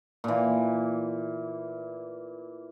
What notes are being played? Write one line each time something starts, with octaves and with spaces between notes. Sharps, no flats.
A#2 E3